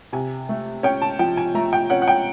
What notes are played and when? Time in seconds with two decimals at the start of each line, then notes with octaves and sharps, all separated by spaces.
0.13 C3 G#5
0.49 A3
0.83 C#4 G5
1.02 A5
1.19 F3 G5
1.37 G#5
1.54 A3 A#5
1.73 G5
1.90 C#4 F#5
2.02 F#5
2.08 G5